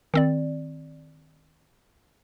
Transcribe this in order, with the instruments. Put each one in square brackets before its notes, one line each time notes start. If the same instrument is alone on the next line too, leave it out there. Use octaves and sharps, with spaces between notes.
[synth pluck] D#3 C4 D5